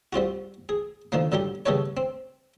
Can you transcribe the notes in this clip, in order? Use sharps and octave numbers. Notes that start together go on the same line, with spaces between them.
G3 C4 F4 F#4
G#4
D3 D#3 F3 A#3
D3 F#3 G3 G4
C#3 G3 B3 A4 B4 C#5
C4